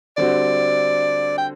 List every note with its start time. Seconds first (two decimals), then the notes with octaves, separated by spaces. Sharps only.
0.17 D3 G3 C4 F#4 D5
1.38 G5